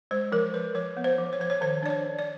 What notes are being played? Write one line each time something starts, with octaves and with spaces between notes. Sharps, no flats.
G#3 C5
F3 A#4
F3 B4
F3 C#5
B3
C5
F3
C#5
F3 C5
C#5
D#3 C5
D4 D5
C#5
D4
D5